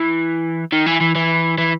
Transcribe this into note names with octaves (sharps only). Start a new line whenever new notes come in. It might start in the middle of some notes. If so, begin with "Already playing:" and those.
Already playing: E3
D#3
E3
E3
E3
E3